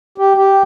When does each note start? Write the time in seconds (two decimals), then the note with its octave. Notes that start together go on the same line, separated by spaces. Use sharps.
0.18 G4
0.37 G4